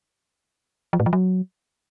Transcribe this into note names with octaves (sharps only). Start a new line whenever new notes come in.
F3
A2
F3
F#3